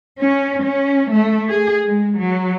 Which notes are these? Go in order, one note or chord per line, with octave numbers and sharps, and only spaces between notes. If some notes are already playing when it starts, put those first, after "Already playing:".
C#4
C#4
A3
G#4
G#3
F#3